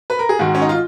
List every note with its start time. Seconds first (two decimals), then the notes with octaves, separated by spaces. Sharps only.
0.10 B4
0.19 A#4
0.29 G#4
0.39 G#2 D#3 F#4
0.55 C#4
0.62 D#4
0.69 F4